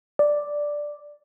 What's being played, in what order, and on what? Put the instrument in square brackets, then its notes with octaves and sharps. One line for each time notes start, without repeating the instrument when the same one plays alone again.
[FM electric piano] D5